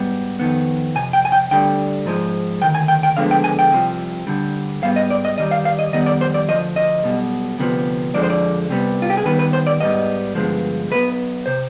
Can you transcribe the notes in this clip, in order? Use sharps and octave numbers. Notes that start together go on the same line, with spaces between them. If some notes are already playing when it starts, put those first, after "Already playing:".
Already playing: G#2 G3 B3
F2 D#3 B3
F2 C3 G#5
G5
G#5
G5
D2 D3 G3 G5
G#2 F3 G#3
D2 C3 D#3 G5
G#5
G5
G5
D2 D3 F3 G#3 B3 F5
G5
G#5
G5
C2 C3 F3
D2 D3 G3
G#2 G3 B3 F5
D#5
D5
D#5
G2 D#3 G3 D#5
F5
F5
D#5
F2 D#3 G3 B3 D#5
D5
C5
D5
D2 C3 F3 D#5
D#5
B1 B2 G3
D2 C3 F3 B3
F2 D3 F3 G#3 D5
C5
D5
C2 C3 G3 B3
F4
G4
G#4
D#2 D#3 G3 B3 B4
B4
C5
D5
G#2 G3 B3 D#5
G2 D3 F3 G#3 B3
B1 B2 B3 B4
C3 C5